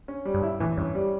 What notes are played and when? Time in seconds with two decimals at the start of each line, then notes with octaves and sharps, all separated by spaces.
0.08 C#4
0.25 G3
0.34 G2
0.43 E4
0.60 A2 E3
0.77 G2 C#4
0.95 G3